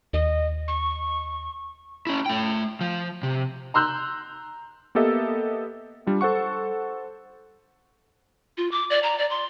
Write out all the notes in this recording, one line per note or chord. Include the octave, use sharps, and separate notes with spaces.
D#2 D#5
C#6
C#4 E4
A3 G5
F3
C3
A#5 C6 E6 F#6 G6
A#3 B3 G4 A4 D#5 E5
G3 D4 F4
A4 C5 F#5 C#6
F4
D6
D5
A#5
D5
C6